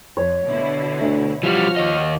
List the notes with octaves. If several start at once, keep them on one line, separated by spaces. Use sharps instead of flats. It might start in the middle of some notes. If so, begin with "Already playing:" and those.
F2 C#5
B2 D3 E4
D2
E3 F3 G3 F#4 F6
D#2 D#5